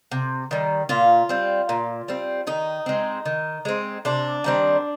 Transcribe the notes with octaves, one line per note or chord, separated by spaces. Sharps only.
C3
D#3 G3
A#2 F4
G3 C4
A#2
G3 C4
D#3 D#4
G#3 C4
D#3
G#3 C4
C3 D4
D#3 G3 C4